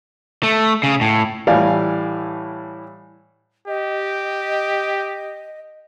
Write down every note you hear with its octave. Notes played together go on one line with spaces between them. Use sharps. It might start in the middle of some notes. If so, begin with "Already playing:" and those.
A3
C#3
A2
A2 E3 G3 D5 F5 G#5
G4 D#5